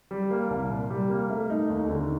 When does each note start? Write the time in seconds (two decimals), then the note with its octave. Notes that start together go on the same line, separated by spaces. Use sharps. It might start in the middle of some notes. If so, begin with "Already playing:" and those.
0.11 G3
0.31 A#3
0.51 C2
0.70 A#2
0.90 G3
1.10 A#3
1.30 A3
1.50 D#4
1.70 D#2
1.89 D3